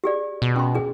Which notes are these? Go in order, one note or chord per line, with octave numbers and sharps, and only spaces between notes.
G4 G#4 D5
B2
C#4 C6
D4 G#4